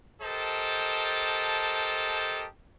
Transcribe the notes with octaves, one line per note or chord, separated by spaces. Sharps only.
G4 A4 A#4 C5 D#5 A5